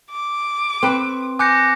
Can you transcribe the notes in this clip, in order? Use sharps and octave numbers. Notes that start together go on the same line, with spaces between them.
D6
C4 B4
G#5 D6 F#6 G6 A#6 C#7